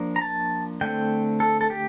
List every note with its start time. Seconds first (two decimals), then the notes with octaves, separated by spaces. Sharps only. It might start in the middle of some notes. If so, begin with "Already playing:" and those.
Already playing: F3 A#3 D4
0.16 A#5
0.21 A5
0.81 D3 A3 C4 G5
1.40 A4
1.61 A4
1.70 G4